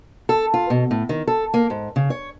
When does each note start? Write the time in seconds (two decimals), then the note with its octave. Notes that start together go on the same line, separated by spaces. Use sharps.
0.29 A4
0.54 F4
0.70 B2
0.91 A2
1.09 D#3
1.27 A4
1.54 A#3
1.70 G#2
1.96 C#3
2.10 C#5